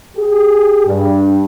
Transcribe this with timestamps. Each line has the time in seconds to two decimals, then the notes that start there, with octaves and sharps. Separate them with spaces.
0.17 G4 G#4
0.85 G2